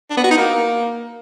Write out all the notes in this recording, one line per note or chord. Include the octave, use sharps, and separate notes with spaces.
D4
B3
F#4
D#4
A#3